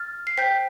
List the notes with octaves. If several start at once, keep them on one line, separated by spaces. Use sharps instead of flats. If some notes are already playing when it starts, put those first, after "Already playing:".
Already playing: F6 A6
C7
C5 G5 G6 B6